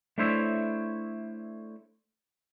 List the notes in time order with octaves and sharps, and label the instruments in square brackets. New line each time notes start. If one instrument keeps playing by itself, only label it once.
[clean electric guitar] A3 D4 E4 C5 C#5 E5